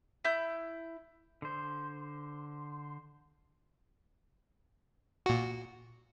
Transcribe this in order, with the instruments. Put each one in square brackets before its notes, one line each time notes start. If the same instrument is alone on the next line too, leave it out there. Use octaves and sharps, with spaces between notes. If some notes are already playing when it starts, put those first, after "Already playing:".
[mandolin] E4 G6
[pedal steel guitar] D3 C5
[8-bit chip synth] A#2 F#4